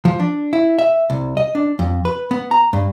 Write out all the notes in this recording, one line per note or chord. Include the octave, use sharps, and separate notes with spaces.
F3
D4
E4
E5
C2
D#5
D4
F2
B4
B3
A#5
G2